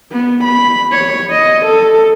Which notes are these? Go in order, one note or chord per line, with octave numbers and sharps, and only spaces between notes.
B3
B5
C#5
D#5
A4